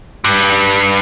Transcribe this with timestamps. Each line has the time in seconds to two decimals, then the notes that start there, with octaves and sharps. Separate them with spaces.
0.24 G2